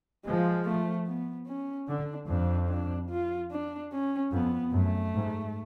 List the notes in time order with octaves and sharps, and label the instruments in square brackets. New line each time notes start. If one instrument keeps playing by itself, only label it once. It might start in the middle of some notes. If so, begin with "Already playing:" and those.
[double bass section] F3 [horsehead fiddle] G#3
[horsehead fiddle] A3
B3
C#4
[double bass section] D3 [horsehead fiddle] D4
[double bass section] F2 [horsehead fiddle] D4
[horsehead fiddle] D4
F4
D4
C#4
[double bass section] F2 [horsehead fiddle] B3
[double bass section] F#2 [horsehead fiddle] A3
[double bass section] G#2